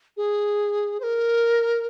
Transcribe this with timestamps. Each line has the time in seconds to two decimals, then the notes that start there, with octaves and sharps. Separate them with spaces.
0.17 G#4
1.00 C5
1.03 A#4